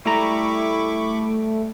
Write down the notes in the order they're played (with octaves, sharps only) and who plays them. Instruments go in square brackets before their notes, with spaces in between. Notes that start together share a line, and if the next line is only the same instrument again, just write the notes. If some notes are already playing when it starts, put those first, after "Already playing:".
[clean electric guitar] G3 A#5 [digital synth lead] A3 [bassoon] E4 [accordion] B5 C#6 D6